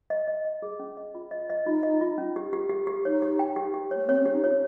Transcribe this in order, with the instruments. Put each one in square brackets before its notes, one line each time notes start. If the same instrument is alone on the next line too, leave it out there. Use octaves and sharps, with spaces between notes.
[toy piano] D#5
D#5
D#5
G#4
C#4
D#5
F4
D#5
D#5
[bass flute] D#4 [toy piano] F4
[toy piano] D#5
F4
C#4
G4
G4
G4
G4
[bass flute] D#4 [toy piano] C#5
[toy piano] G4
G5
G4
G4
[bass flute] A#3 [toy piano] C#5
[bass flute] C4 [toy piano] C#5
[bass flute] C#4
[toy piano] G4
[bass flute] D#4
[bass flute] F4 [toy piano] C#5